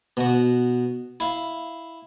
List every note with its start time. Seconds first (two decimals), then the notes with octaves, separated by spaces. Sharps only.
0.17 B2 F#4
1.20 E4 F5